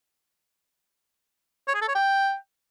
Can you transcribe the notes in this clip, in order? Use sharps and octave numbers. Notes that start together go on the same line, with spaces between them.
C#5
G#4
A4
C#5
G5